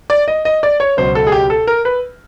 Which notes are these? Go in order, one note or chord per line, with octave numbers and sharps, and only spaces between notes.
D5
D#5
D#5
D5
C#5
C#2 B2 F#3 C5
A4
G#4
G4
A4
A#4
B4